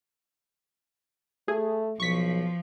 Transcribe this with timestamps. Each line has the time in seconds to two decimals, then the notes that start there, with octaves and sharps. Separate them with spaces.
1.48 A3 G#4
2.00 B1 F3 C#6 B6